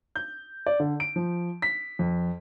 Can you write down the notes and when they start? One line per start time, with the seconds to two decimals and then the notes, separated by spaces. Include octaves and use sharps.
0.16 G6
0.66 D5
0.80 D3
1.00 D7
1.16 F3
1.62 B6
1.99 F2